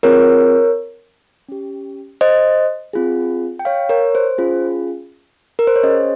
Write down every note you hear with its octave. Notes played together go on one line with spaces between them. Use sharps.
C4 F4 G#4 A#4 C#5
C#4 G4
C5 D#5
C4 F4 G#4
G5
C#5 F5
A#4 C#5
C5
C#4 F4 G#4
A#4
C5
C#5
C#4 G#4 C5 D#5